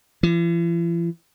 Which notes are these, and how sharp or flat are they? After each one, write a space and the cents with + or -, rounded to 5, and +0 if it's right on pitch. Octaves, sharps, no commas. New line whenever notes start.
E3 +45